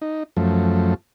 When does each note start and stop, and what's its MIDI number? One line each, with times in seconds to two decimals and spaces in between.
0.02 0.23 63
0.37 0.94 42
0.37 0.94 53
0.37 0.94 57